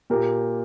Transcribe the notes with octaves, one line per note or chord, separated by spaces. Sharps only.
A#2 A#3 G4 A#4